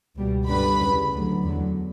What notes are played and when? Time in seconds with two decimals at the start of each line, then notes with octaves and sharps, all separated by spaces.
0.16 C#2 B2 G3
0.47 G2 D3 G3 B4 B5
0.79 E2 C#3 G3
1.11 D2 D3 F#3
1.43 E2 D3 F#3